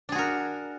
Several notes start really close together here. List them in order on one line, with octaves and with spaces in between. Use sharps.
D4 G#4 F#4 A#4